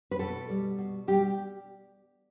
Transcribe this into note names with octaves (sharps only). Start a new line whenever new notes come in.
B4
B2 A4
G3
B2
G3 G4